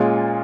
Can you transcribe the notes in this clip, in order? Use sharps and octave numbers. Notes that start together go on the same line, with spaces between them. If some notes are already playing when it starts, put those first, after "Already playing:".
Already playing: A#2 G#3 C#4 F4 G#4